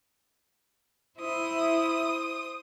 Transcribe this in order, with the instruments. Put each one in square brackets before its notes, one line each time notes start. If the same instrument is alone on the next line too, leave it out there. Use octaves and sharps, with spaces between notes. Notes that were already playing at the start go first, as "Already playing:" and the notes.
[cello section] E4 [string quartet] C5 D#6